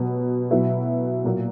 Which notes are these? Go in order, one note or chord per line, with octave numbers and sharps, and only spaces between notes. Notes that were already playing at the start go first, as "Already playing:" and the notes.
Already playing: B2 F#3 B3
B2 F#3 B3 E4
A#2 F#3 A#3